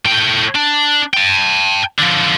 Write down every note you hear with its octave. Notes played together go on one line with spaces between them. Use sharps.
A2 G5
D4
G5 A5
D3 F3